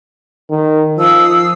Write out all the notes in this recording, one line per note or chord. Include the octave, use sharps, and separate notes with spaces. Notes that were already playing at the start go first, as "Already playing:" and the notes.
D#3
F3 F5 D#6 E6